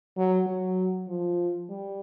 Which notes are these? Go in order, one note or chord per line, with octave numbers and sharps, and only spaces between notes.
F#3
F#3
F3
G3